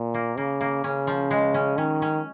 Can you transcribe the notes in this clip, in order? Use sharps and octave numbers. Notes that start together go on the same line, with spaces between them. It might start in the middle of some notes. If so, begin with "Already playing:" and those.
Already playing: A#2
A#3
C#3 A#3
A#3
C#3 C#4
F3
G#3
C#4
D#3 C#4
C#4